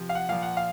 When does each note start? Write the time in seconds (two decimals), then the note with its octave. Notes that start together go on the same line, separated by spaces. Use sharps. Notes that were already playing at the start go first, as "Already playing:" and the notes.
Already playing: C3 F3
0.09 F5
0.15 F#5
0.29 A#2 F3 F5
0.42 F#5
0.57 F5